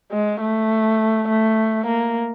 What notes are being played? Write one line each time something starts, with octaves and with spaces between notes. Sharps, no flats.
G#3
A3
A3
A#3